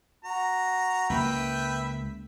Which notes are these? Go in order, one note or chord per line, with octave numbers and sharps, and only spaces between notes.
F#4 A#5
C#2 A#3 B4 E5 G5